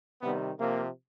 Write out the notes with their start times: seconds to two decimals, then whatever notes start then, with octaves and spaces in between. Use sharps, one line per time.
0.22 C3 D#3 G3 B3
0.59 C3 F3 A#3